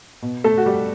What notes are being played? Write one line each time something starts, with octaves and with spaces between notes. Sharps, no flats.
B2
A3 A4
F#4
G3 G4